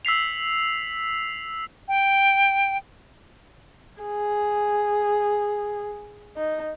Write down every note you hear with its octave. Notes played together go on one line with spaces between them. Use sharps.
E6 B6 C7 F7
G5
G#4
D#4